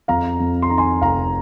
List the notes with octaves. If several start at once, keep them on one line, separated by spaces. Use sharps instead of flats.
F2 F5 A#5
F2
C6
D#3 A#5
G#5 C6
F1 F5 A#5